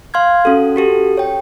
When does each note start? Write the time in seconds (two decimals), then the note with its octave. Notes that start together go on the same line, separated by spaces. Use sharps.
0.14 F5 C6 F6 G#6
0.45 C#4 F#4 A4
0.76 F#4 G4 A4
1.17 C#5 G5